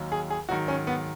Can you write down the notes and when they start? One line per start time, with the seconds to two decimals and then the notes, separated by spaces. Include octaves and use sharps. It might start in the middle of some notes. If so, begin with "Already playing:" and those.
Already playing: D#2 D#3 F#3
0.12 G#4
0.30 G#4
0.49 G#2 D#3 F#3 F#4
0.68 C#4
0.87 B3